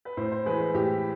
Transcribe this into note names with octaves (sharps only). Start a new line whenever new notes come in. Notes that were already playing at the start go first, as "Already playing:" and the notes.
B4
A2 C5
C5
E3 G#3 B4
B4
A2 G4